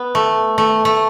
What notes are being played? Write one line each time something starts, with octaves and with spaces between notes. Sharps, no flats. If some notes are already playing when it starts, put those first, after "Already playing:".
Already playing: B3
A3
A3
A3